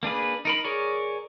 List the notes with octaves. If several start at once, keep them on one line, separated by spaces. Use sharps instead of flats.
A#3 D4 G#4 B4
D#4 A#4 B5
G#4 A#4 C#5 D5